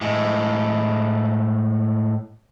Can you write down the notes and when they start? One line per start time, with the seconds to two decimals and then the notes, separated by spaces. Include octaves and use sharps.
0.01 A2 G#3